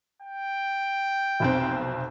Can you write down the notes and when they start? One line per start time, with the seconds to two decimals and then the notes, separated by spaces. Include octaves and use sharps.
0.23 G5
1.40 F1 B1 C4